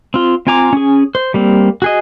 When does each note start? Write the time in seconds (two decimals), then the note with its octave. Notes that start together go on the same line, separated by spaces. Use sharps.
0.14 C4 F4
0.47 C4 F4 G#5 A#5 D6
0.73 C#4 G#4
1.15 C5
1.34 G3 A#3 C4
1.82 F#4 G#4 D#5